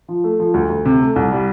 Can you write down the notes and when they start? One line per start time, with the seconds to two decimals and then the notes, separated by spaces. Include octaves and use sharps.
0.08 F3
0.24 A3
0.39 F3
0.54 D2
0.70 D2
0.86 C3
1.01 A3
1.16 C2
1.32 G3